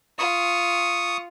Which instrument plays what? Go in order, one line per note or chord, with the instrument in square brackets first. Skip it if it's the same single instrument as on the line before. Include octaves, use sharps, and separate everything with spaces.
[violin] F4 [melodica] C#6 D#6